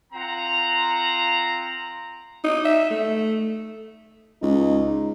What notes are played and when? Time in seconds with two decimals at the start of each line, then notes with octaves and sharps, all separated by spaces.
0.13 C4 F4 F#5 A#5
2.44 D#4
2.65 E5
2.90 A3
4.42 C#2 D#4